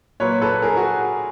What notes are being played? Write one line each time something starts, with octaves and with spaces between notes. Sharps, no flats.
A#2 F#3 B4 C#5
A4 B4
G#4 A#4
F#4 G#4